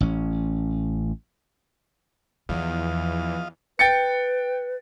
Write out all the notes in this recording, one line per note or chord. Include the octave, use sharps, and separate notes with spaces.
A1 C#4
E2 F3 F4 D#5 F5
B4 G5 A6 C#7